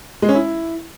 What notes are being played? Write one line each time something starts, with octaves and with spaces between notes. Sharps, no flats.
G#3
C#4
E4